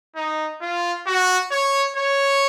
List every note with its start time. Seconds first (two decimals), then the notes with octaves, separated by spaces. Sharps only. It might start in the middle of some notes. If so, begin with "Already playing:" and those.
0.16 D#4
0.61 F4
1.07 F#4
1.51 C#5
1.96 C#5